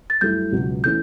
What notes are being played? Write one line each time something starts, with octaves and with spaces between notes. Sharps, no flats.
A6
G2 F#3 A3 E4 G6
C#2 B2 F#3
E3 A3 C#4 G6